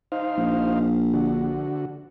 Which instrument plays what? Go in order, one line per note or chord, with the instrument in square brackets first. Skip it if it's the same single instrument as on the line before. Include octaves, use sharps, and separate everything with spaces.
[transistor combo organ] D#4 C5 F5
[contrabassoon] A#1
[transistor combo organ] D3 F#4